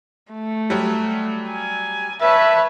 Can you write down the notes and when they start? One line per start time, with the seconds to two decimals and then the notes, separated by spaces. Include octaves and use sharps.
0.33 A3
0.70 F#3 G3
1.50 G#5
2.21 B4 C#5 E5 A5